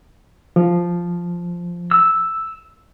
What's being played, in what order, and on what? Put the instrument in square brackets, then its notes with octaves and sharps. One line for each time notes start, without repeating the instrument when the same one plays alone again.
[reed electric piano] F3
[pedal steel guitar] E6